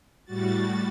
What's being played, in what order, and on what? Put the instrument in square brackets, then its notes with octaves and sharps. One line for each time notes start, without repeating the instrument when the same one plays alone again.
[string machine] A2 G3 F#4 A6